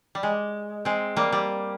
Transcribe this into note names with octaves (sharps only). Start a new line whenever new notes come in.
G3
G#3
G#3 C4
G3 A#3
G3